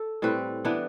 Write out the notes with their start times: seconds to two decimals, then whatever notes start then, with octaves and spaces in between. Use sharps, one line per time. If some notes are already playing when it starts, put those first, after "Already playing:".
Already playing: A4
0.22 A2 G3 C4 B4
0.65 E3 B3 D4